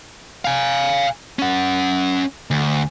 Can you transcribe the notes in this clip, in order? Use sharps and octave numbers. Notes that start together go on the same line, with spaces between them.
F5 G#5
C#4 F#5
D2